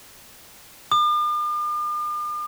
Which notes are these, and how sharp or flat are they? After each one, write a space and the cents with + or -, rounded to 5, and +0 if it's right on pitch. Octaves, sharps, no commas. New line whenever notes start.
D6 +45